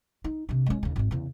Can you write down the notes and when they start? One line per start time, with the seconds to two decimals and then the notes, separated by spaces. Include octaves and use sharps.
0.24 D#4
0.49 C3 D4
0.66 G#3 C#4
0.83 D#2 C#3
0.96 G#1 G#3
1.11 E2 C#3